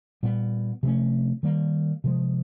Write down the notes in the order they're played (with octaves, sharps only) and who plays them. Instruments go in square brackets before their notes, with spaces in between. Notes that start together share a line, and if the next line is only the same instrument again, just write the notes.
[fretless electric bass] A#2 G3 B3
C3 F3 A3 C#4
D#3 G3 A#3
C3 F3 G#3